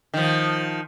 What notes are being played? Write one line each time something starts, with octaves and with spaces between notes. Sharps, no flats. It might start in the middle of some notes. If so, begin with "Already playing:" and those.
D#3 F3